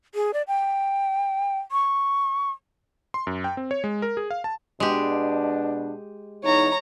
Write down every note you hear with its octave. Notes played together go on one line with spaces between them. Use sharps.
G#4
D5
G5
C#6
C6
F#2
G5
C4
C#5
G#3
A#4
G#4
F5
A5
B2 G#3 D4 G4
E2 D#4 C#5 A#5